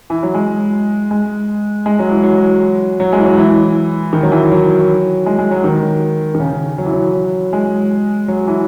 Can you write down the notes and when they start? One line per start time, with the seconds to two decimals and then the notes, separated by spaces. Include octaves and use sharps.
0.10 E3
0.23 F#3
0.34 G#3
1.11 G#3
1.86 G#3
1.99 F#3
2.11 E3
2.23 F#3
3.00 F#3
3.13 G#3
3.18 E3
3.25 F#3
3.38 E3
4.13 D#3
4.23 F#3
4.32 E3
4.51 F#3
5.26 G#3
5.39 G#3
5.51 F#3
5.64 D#3
6.35 D#3
6.40 C#3
6.78 F#3
6.86 E3
6.93 F#3
7.53 G#3
8.28 F#3
8.47 E3